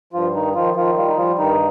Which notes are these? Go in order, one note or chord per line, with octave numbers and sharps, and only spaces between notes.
G2 F3 F4
D#3 D#4
D#3 F3 F4
D#3 F3 F4
G3 F4
D#4
F3 G3 F4
G2 D#3 D#4